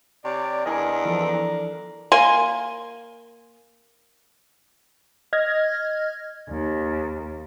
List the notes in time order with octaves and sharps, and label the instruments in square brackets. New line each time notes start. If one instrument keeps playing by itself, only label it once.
[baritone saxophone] C3 [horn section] C#5 D5
[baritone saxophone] E2 [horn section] D4 A#4 [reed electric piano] D#5 G#5
[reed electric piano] E3 F3 A4
[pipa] A#3 A#4 G#5 C6
[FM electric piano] D#5 F6 G#6 A#6
[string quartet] D#2